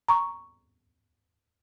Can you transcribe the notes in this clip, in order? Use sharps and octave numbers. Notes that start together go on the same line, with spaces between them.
A#5 C#6